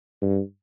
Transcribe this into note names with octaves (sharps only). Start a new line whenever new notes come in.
G2